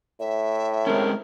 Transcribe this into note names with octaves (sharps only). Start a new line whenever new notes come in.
A2 E5
G#3 C4 C#4 A#4